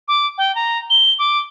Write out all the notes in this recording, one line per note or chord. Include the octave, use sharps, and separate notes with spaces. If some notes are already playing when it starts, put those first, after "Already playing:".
D6
G5
A#5
G7
D6